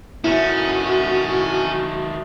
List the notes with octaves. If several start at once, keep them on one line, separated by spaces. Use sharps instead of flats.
D#3 A3 C#4 E4 F#4